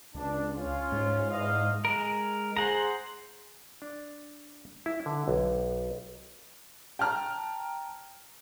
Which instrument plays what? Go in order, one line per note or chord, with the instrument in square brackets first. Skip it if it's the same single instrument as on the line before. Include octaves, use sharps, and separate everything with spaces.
[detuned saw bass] C#2 [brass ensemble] D4
[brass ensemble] C#4 F4
[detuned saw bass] G#2
[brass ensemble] E2 D#5 F5
[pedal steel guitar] G#3 A#4
[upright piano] G#4 [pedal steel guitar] C5 F#5 A#5
[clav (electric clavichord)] D4
E4
D3
B1
[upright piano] G5 A5 A#5 F6